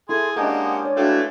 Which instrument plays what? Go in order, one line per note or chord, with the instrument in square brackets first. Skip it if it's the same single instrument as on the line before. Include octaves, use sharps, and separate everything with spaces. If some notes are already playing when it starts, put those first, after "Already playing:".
[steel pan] E4 [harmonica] G#4 [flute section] A4 C6
[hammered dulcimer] G#3 C#4 D4 [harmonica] A#3 G4 [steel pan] A#4 [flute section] F#5 D#6
[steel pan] C#5 D5
[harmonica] A3 E4 [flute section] D4 F#4 B4 [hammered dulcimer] F5 [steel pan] G5